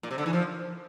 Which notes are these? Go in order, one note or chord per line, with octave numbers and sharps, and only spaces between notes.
A#2
C3
D3
E3
F3